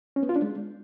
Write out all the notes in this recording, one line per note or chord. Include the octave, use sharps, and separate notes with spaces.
C#4
B3
F4
D4
G#3